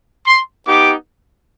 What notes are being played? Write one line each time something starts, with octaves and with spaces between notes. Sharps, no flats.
C6
B3 D#4 G4 D6